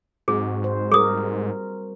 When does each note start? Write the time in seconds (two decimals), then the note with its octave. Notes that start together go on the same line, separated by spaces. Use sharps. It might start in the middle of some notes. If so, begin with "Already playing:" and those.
0.28 G#2 C4 F#4 G#4
0.64 C5
0.92 G3 G#4 A#4 D#6